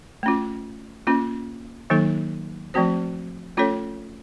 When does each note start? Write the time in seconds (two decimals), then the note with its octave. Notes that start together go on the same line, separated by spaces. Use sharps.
0.23 A3 C#4 F4
1.07 A#3 C#4 F4
1.90 D#3 F#3 A#3 D#4 A4
2.74 F3 A3 C4 F#4 C5
3.57 A3 C#4 F4 A4 C#5